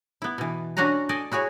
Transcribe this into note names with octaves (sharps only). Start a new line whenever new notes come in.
B3 E4
B2 E3
C#4 D4 F#4 F#5 G#5 A#5
A4 D5 D#5 G#5
E4 F#4 G#4 C#5